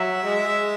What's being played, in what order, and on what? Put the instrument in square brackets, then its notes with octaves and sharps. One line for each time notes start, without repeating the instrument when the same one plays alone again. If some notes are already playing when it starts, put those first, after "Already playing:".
Already playing: [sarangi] F#3 [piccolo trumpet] E5
[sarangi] G#3